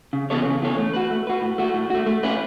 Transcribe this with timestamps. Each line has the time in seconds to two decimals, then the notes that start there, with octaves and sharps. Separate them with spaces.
0.13 C#3
0.30 E3 B3 A4 C#5
0.45 C#3
0.62 E3 B3 A4 C#5
0.78 A3
0.93 F#4 B4
1.11 A3
1.27 F#4 B4
1.42 A2
1.58 A3 F#4
1.74 A2
1.90 A3 F#4
2.06 A3
2.23 C#4 E4 B4